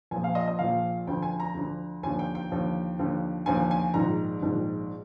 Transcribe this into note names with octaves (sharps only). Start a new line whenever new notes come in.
A#1 A#2 F3 G#5
F5
D#5
D#5
A#1 A#2 F3 F5
D2 D3 F3 G5
G#5
A#5
D2 D3 F3
D#2 D3 F3 G#5
G5
G5
D#2 D3 F3
D#2 D3 F3
D#2 D3 F3 G#5
G#5
A#1 G#2 D#3 A#5
A#1 G#2 D#3